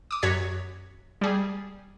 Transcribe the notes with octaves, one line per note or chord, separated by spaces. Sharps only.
D6 D#6
F#2 F#4 C#5 G#6 B6
G3 G#4